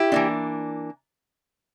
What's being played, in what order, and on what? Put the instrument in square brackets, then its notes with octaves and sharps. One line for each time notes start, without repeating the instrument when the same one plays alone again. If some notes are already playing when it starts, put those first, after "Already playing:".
Already playing: [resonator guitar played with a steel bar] E4 G4
E3 A#3 D4